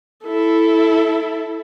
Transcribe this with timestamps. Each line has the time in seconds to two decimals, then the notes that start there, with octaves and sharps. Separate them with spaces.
0.25 E4 A4